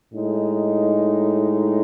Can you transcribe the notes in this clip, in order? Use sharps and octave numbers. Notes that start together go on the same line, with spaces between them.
A2 G#3 D#4